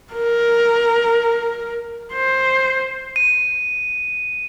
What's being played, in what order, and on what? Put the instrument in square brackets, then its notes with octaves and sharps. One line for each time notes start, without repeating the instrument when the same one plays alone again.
[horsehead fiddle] A#4
C5
[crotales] D#7